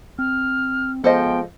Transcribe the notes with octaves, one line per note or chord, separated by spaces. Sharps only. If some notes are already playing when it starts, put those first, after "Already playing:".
C4 F6
F3 G#3 B3 A4 C5 D#5 G5